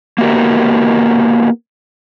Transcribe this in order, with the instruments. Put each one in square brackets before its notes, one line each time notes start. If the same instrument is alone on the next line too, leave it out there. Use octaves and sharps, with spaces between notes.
[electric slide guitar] A#3 B3 E4 F#4 G4 A#4